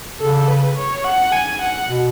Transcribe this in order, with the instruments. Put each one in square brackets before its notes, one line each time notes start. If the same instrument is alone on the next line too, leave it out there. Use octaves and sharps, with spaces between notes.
[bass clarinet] C#3 [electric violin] A4
[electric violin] B4
C#5
F#5
G#5
F#5
[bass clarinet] B2